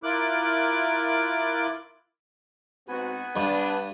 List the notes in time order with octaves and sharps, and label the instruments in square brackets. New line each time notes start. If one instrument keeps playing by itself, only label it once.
[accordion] E4 F4 A#4 D6 F#6
[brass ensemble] G#2 C4 F#4 [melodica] B3 B4 G#5
[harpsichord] G2 [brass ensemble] D4